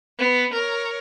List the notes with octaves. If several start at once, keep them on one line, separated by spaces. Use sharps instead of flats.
B3
A#4 C#5